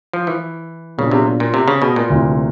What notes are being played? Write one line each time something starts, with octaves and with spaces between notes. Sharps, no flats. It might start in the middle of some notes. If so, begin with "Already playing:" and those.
F3
E3
A#2 C#3 F#3 B3 D4
C3
A#2
C3
C#3
B2
A#2
D2 C3 E3